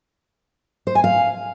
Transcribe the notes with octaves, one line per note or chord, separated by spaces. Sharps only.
C5
G#5
F5